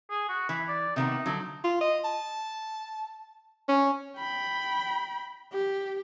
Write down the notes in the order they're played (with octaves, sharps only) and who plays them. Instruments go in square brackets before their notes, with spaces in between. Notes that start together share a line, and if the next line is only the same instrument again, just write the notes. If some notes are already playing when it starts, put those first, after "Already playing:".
[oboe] G#4
F#4
[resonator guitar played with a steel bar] E3 [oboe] B5
[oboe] D5
[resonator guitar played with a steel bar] C3 D#3 B3 [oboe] D#4
[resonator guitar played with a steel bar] D3 F#3
[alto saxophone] F4
D#5
A5
C#4
[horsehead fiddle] G5 B5
G4